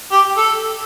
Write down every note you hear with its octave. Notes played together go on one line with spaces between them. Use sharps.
G4
A4